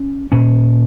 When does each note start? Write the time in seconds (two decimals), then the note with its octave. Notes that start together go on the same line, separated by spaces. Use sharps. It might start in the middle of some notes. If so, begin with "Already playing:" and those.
Already playing: C#4
0.32 A#2 C#4